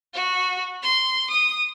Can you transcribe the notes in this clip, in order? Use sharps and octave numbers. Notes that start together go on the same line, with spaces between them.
F#4
C6
D#6